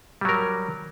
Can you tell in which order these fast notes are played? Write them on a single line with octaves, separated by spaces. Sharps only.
G3 F#3 A#4